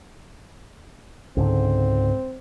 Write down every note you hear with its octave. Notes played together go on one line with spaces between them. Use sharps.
C#2 G#2 D3 C4